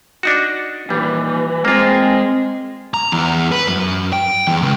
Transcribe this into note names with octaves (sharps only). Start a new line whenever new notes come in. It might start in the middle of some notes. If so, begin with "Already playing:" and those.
D4 D#4 F#4
D#2 A#2 E3 G3
G#3 A#3 C4 F4 G#5
A#5
E2
B4
F#2
G5
E2
C#2